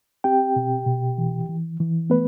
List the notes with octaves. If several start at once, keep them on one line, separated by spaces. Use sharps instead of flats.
C4 G4 G5
B2
B2
E3
E3
E3
A3 B3 B4